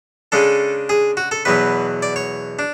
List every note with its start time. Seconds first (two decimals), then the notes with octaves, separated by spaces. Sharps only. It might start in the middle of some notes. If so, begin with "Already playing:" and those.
0.32 C#3 G#3 D4 A4
0.89 G#4
1.17 F#4
1.31 A4
1.45 E2 B2 F#3 B4
2.02 D5
2.16 C#5
2.59 D4